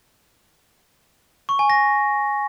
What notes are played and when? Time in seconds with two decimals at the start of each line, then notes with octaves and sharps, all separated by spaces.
1.49 C#6
1.59 G#5
1.70 A#6